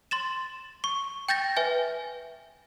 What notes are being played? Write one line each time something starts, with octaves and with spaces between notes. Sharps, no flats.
C6 A6 E7
C#6
G5 G6 A6 A#6
B4 E5 G#5